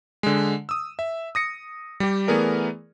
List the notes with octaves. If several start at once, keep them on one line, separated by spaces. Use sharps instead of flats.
D3 G#3
D#6 E6
E5
D#6 A#6 C#7
G3 G4
E3 A3 B3 G#4 A#4 D5